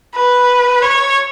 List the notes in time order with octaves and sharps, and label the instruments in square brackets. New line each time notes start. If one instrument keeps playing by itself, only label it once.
[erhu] B4
C#5